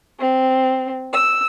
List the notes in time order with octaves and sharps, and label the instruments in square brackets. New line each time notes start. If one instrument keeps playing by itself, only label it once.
[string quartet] C4
E6